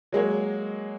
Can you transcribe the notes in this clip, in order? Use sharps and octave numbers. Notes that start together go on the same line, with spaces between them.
F#3 G#3 A#3 C#5